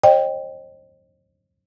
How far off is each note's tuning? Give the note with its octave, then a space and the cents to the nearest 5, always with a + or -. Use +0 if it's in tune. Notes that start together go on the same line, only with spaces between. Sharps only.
C5 +40 D#5 -40 G5 +0